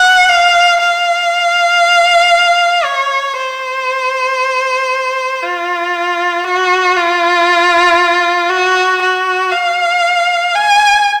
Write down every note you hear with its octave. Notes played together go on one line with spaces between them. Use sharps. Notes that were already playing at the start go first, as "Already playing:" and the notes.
Already playing: F#5
F5
F5
C#5
C5
F4
F#4
F4
F#4
F#4
F5
G#5